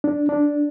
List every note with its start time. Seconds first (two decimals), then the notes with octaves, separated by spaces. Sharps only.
0.04 D4
0.29 D4